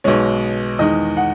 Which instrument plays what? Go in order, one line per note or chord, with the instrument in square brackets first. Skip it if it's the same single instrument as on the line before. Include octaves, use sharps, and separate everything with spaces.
[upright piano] B1 B2 G#3 C#5
E2 D#3 G#3 D#5
F#5